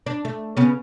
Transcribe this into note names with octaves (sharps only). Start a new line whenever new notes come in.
D4
A3
C#3 B3